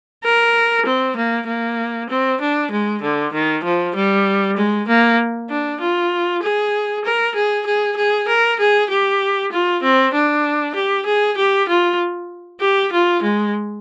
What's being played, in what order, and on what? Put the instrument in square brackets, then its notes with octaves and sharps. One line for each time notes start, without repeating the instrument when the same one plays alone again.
[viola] A#4
C4
A#3
A#3
C4
D4
G#3
D3
D#3
F3
G3
G#3
A#3
D4
F4
G#4
A#4
G#4
G#4
G#4
A#4
G#4
G4
F4
C4
D4
G4
G#4
G4
F4
G4
F4
G#3